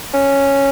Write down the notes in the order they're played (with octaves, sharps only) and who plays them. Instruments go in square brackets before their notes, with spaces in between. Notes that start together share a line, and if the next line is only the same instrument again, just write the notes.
[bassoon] C#4